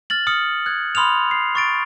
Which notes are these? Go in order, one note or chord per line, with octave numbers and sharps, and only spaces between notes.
F6 A6 F#7
D#6 F6 C#7
F#6 G#6
B5 C6 D#6 F6 F7
C7
C#6 A6 D7